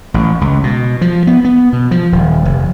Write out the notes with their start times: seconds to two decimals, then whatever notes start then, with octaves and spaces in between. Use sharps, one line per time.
0.14 A1
0.41 C#2
0.64 B2
1.01 F3
1.27 B3
1.45 B3
1.73 B2
1.91 F3
2.12 D#1
2.45 F1